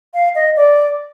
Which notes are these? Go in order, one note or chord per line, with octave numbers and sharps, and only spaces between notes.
F5
D#5
D5